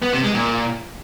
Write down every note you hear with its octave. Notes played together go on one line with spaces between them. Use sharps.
B3
C3
G#3
A#2